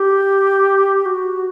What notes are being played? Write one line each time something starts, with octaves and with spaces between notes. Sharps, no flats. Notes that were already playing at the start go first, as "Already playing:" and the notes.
Already playing: G4
F#4